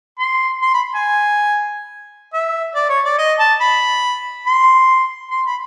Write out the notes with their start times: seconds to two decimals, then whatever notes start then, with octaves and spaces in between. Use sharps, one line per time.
0.19 C6
0.62 C6
0.74 B5
0.95 G#5
2.33 E5
2.75 D5
2.89 C#5
3.05 D5
3.18 D#5
3.39 A5
3.61 B5
4.47 C6
5.31 C6
5.46 B5